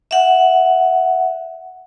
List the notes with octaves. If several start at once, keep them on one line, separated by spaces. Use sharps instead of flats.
E5 F#5